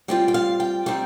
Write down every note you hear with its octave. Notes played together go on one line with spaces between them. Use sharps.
G3 C4 F4 G5
G5
F5
G5
G3 C4 D#4 G5